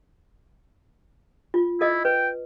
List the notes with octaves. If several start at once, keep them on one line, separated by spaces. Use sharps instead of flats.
F4
E4 A4 D#5
B4 G5